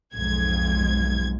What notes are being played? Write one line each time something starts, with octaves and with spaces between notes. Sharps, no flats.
B1 F2 G#2 G#6